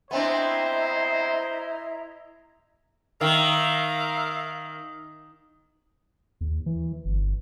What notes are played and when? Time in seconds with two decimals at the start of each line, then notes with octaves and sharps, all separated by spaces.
0.11 B3 C4 D4 E4 C5 D#5 E5 A#5
3.21 D#3 A#4 E5 F5
6.41 D#2
6.66 E3
7.05 G1